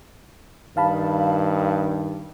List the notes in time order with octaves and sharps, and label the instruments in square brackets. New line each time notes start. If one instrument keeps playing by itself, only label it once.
[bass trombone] G2 [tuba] D#3 [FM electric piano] F5 A5 B5